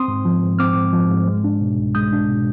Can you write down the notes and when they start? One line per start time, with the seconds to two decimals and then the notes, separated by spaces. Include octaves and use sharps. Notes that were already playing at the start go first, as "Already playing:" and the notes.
Already playing: C4 C6 D#6
0.08 G#2
0.25 F3
0.42 G#2
0.59 C4 D6 F6
0.76 G#2
0.93 F3
1.10 G#2
1.27 G#3
1.44 D4
1.61 B2
1.78 C2
1.95 G#3 D#6 G6
2.13 D4
2.29 B2